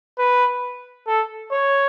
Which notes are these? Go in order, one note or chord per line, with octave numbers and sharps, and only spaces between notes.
B4
A4
C#5